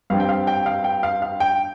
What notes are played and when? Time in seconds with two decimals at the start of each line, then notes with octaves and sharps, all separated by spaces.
0.10 G2 G3 C4 F5
0.20 G5
0.29 F5
0.47 G5
0.66 F5
0.84 G5
1.03 F5
1.22 F5
1.40 G5